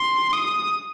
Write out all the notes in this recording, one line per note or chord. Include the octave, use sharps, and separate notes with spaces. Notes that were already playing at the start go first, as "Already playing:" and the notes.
Already playing: C6
D#6